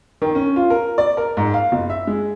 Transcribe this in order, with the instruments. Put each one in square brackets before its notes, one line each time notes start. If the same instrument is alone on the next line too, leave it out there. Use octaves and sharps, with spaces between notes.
[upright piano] D#3
C#4
F4
A#4
D5
A#4
G#2
F5
F#1
E5
G#3